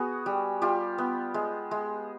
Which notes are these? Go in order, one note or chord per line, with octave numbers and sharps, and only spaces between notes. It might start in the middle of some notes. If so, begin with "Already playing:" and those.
Already playing: B3 F#4 G#4
G3
G3 F4 G4
B3
G#3
G#3